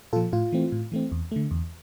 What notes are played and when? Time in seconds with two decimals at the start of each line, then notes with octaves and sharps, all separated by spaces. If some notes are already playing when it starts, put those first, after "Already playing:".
0.13 A#2 F4 A4
0.16 F3
0.33 A2 F4
0.53 E3 A3 C4
0.72 A2
0.92 E3 A3 C4
1.12 E2
1.32 D3 A3
1.51 E2